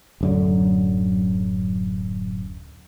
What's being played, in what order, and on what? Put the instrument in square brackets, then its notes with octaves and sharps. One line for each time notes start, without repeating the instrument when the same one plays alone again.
[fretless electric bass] D1 F#2 D3